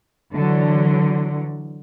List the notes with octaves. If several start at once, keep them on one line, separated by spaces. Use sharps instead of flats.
D3 E3 F#3